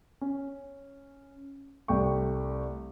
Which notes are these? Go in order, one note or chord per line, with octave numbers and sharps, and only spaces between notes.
C#4
C2 A3 G5 C#6